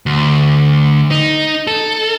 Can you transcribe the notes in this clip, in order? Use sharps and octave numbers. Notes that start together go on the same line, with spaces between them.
D2
D#4
A4